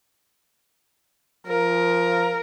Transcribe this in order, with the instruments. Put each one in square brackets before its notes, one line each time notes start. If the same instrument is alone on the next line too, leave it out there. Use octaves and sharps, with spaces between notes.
[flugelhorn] F3 [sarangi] A#4